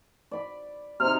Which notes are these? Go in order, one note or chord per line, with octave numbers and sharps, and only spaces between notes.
D5 B5
C3 D#4 F6